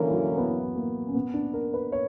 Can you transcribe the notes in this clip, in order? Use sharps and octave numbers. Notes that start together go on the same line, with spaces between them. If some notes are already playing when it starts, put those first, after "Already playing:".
Already playing: D3 E3 F#3 A#3 C#4 E4 A#4
F#3
B3
A#3
C#4
B3
D4
A#4
B4
C#5